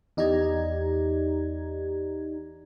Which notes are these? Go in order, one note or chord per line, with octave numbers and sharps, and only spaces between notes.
E2 D#4 G4 D5 A#5 G#6